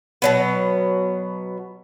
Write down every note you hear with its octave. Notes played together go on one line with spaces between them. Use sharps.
B2 F#3 B3